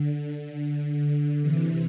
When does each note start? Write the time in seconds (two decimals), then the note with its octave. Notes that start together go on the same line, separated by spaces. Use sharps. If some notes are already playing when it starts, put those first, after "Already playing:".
Already playing: D3
1.42 C3 E3